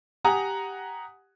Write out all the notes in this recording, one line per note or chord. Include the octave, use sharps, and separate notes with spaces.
G4 F#5 G#5 A#5 D#6